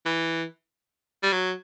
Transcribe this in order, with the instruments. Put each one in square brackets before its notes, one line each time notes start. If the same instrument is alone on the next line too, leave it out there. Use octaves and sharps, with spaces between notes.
[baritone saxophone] E3
G3
F#3